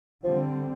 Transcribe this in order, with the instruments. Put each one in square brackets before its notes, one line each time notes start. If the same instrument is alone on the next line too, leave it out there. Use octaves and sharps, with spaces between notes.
[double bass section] D3 G3 C4 [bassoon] F3